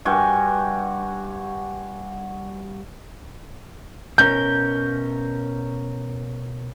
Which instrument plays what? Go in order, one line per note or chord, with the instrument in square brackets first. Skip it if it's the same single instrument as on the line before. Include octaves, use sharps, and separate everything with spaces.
[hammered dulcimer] G2 F#4 G5 G#5
[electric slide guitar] B2 C#4 A#4 [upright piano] G6